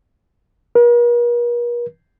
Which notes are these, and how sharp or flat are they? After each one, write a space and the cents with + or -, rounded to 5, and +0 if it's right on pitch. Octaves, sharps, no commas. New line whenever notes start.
A#4 +45